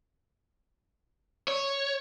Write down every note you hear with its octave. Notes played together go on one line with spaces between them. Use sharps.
C#5